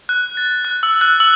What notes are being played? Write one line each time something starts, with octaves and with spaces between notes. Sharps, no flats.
F#6
A6
F#6
E6
F#6
E6